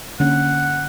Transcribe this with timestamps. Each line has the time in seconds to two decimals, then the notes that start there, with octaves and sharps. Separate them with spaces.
0.20 D3 A#3 C#4 F#5